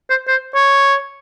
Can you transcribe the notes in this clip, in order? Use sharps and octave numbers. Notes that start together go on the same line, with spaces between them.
C5
C5
C#5